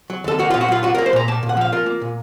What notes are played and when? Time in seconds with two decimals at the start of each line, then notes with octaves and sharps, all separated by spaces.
0.10 F#3
0.24 D#2 A4
0.39 A#3 F#4
0.50 A#2 F4
0.61 F#4
0.68 F#3 F4
0.83 F4 F#4
0.95 A#3 A#4
1.06 C5
1.13 A#2 A#5
1.28 A#3 A5
1.43 A#2
1.49 F#5
1.57 F3 F5
1.72 F4 A#4
1.86 A#3
2.02 A#2